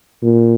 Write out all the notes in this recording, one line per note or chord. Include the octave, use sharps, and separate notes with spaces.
A#2